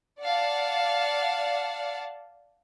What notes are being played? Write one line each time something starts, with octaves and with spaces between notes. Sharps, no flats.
D5 F5 F#5 A5